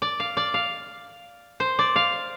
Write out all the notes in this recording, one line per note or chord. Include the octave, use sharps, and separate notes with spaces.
D5
F5
D5
F5
C5
D5
F5